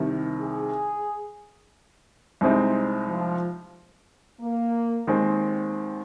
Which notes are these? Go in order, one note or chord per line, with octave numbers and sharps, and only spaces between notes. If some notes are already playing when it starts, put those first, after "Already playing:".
Already playing: C2 C3 D#3
G#4
C2 C3 G#3 C4 D#4
F3
A#3
D#2 D#3 G#3 C4